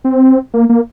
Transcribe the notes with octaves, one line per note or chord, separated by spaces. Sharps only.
C4
A#3
A#3